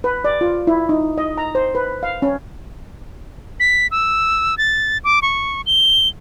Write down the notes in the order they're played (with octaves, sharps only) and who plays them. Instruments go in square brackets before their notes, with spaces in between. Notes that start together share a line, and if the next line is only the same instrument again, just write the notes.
[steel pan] B4
D5
F4
E4
D#4
D#5
A#5
C5
B4
F5
C#4
[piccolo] B6
E6
A6
D6
C#6
G7